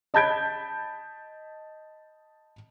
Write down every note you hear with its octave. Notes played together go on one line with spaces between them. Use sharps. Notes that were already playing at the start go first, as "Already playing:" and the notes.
D#5 A5 B5 G6 G#6 D7